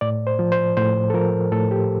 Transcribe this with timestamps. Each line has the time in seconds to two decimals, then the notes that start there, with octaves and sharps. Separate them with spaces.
0.01 A2 D5
0.27 C5
0.39 F3
0.52 C5
0.77 A2 C5
1.10 A4
1.14 F3 A#4
1.52 A2 A4
1.71 G4